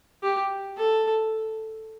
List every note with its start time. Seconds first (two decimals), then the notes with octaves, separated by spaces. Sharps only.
0.23 G4
0.78 A4